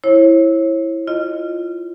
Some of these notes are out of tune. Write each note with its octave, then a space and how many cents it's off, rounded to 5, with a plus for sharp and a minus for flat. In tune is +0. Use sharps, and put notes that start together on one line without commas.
E4 +0 C#5 -40
F4 +0 D#5 -10